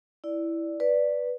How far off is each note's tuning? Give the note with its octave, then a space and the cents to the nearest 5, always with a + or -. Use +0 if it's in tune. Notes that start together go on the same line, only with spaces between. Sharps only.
E4 +0 D5 +0
B4 +0 D5 +0